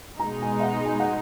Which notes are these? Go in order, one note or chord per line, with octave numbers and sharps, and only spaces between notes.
B2 G#3 D#4 A#5
G#5
E5
F#5
G#5
F#5